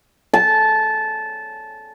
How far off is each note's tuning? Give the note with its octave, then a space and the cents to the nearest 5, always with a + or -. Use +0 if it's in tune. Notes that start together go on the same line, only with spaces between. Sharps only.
A5 -15